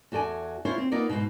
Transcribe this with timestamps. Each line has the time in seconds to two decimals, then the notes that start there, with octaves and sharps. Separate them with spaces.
0.12 E2 F#4 A4 D5 G#5
0.65 E4 F4 C5 C#5
0.78 C4
0.92 A#3 B3 D#4 F4 D5
1.09 G#2 B2